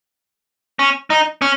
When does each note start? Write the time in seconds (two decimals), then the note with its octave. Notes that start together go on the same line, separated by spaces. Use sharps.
0.79 C#4
1.10 D#4
1.42 C#4